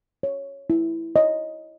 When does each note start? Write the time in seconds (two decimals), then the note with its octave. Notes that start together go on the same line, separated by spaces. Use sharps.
0.23 C#5
0.70 E4
1.16 C#5 D#5